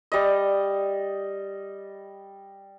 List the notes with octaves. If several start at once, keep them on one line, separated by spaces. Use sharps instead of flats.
G3 D#5